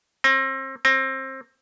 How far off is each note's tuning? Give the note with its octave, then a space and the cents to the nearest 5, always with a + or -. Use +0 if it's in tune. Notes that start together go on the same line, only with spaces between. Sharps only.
C4 +35
C4 +25